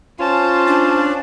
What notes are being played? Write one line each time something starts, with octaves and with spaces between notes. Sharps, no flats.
C#4 F4 C5 A5
D4